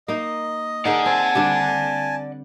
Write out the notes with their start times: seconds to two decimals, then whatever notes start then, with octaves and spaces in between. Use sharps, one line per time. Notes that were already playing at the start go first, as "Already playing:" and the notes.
0.08 A#3 D#4 D#5
0.85 D#4 G#4 A#4 D5 F#5
1.06 C4 G#5 A5
1.35 D3 G3 D4